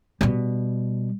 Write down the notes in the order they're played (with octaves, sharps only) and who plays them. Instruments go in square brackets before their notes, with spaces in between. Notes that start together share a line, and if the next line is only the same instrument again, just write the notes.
[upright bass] B2 G3